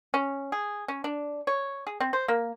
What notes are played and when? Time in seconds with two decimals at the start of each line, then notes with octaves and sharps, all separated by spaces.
0.14 C#4
0.52 G#4
0.88 C#4
1.04 D4
1.47 C#5
1.87 G#4
2.00 C4
2.13 C5
2.28 A#3